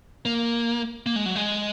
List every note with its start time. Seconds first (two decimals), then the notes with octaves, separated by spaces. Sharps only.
0.25 A#3
1.06 A#3
1.16 G#3
1.26 F#3
1.36 G#3